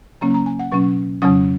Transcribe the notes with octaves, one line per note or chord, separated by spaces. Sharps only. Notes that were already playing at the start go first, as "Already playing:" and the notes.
C#3 F#3 A#3 C#4 A#5
A#5
G#5
F#5
B2 F#3 C#4 C#6
F2 C#3 F#3 C#4 D#6